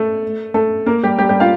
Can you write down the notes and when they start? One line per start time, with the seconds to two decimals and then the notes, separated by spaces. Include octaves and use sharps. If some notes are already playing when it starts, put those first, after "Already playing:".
Already playing: A3 A4
0.54 A3 A4
0.86 A#3 A#4
1.03 G3 G4
1.19 G3 G4
1.29 G3 G4
1.40 F4 F5